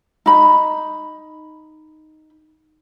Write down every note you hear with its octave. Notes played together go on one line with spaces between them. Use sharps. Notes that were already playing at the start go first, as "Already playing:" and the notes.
D#4 B5